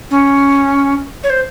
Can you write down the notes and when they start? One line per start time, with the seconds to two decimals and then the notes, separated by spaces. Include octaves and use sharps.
0.10 C#4
1.23 C#5
1.29 C5